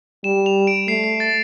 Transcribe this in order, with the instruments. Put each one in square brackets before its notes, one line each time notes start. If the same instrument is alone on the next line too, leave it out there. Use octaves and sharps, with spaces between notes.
[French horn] G3 [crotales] E7
[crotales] F7
D7
[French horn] A3 [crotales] C7
[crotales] C7
A6